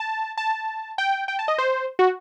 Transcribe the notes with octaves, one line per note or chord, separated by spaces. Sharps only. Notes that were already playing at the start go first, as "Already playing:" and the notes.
Already playing: A5
A5
G5
G5
A5
D#5
C5
F#4